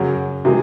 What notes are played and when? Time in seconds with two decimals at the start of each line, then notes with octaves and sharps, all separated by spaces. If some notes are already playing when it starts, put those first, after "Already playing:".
Already playing: F#2 C#3 F#3
0.45 C3 E3 G#3